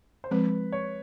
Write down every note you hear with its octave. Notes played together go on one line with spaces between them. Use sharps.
C5
F3 G#3 C4 B4
C#5